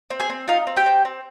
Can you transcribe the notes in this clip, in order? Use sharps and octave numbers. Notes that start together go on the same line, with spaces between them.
C4
G#4 G#5
C4
D#4 F4 F5
C4
G4 G5
C4
C4